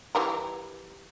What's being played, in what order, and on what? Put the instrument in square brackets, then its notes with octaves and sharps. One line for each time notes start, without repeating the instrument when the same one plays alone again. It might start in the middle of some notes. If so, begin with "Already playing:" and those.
[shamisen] E3 G3 A#4